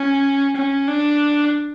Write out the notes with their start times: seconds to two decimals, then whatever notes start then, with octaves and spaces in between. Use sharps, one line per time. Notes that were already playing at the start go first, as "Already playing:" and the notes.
Already playing: C#4
0.56 C#4
0.88 D4